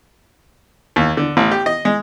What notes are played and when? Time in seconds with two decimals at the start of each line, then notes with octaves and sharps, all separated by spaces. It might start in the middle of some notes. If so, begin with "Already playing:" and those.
0.96 D#2
1.17 D3
1.37 A1
1.51 G4
1.66 D#5
1.85 G#3